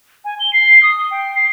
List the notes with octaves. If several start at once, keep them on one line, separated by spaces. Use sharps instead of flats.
G#5
G7
C7
D#6
G5
C7